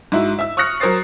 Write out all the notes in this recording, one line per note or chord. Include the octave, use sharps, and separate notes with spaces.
G#2 E4 F#4
E5 E6
C#6 D#6 F6 F#6 A#6 C#7
F#3 A#4 C5 D#6 A6 C7